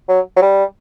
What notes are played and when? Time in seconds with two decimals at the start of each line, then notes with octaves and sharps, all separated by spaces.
0.09 F#3
0.36 F#3
0.42 G3